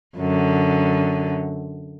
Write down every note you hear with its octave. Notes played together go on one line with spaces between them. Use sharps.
F#2 D3